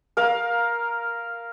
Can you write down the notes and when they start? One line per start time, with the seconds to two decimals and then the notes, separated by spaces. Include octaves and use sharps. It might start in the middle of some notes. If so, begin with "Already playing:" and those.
0.17 A#4 F5